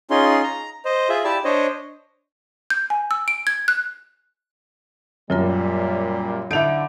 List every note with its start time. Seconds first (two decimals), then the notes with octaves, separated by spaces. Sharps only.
0.11 C#4 D#4 F4 G#4 C6
0.44 A#5
0.85 C5 D#5
1.09 F4 G#4 E5
1.24 E4 G4 D5 A5 E6
1.45 D4 C5 C#5 D#5
2.70 G6
2.90 G#5
3.11 E6
3.28 D7
3.47 G#6
3.68 F#6
5.30 F#2 A#2 F#3 G3 F4 A#4
6.51 D3 D#4 E4 A5 D7 F7